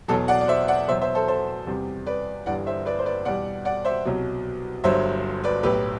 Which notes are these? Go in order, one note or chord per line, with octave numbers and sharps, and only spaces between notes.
E2 B2 F#3 F#4 A4
D5 F#5
D5
C5 E5
D5 F#5
E2 B2 F#3 C5 E5
C5 E5
A4 C5
A4 C5
E2 C3 G3
B4 D5
G1 G2 E3 G3 D5 F#5
C5 E5
B4 D5
C5
B4 D5
E2 B2 G3 D5 F#5
D5 F#5
C5 E5
C2 B2 F#3
G1 G2 F#3 C5 E5
B4 D5
B1 A2 F#3 G4 B4